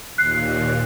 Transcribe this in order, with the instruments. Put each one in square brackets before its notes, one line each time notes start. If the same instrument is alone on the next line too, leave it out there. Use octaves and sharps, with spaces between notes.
[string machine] D#2 A#2 [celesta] F#6 C7